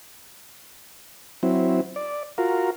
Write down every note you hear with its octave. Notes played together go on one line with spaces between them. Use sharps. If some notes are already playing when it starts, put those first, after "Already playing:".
F#3 C4 E4
D5
F4 F#4 A#4